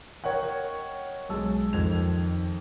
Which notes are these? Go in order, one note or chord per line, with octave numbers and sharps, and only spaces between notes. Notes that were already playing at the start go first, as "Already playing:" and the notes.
A#4 C#5 D#5 F#5 G5
B1 G#3 A5 E6
F2 D#3 G#6 F7